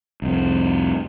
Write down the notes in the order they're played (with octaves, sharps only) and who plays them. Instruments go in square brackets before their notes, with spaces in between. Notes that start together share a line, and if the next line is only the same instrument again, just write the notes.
[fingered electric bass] C2 F2